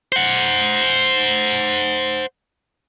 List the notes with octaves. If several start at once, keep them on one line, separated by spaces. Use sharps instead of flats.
C5 F#5